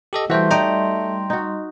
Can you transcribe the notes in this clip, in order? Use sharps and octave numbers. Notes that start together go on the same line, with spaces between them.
G4 A4 D#5
E3 G3 A3 F#4 G4 C5 C6
D#4 D5 D#5 G5 A#5
D#4 F#4